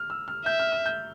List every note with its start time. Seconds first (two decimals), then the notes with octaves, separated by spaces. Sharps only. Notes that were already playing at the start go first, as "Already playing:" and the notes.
Already playing: F6
0.10 E6
0.28 F6
0.45 E5 G6
0.60 F6
0.72 F6
0.86 G6